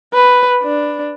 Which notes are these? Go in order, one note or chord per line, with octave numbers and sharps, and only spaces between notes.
B4
D4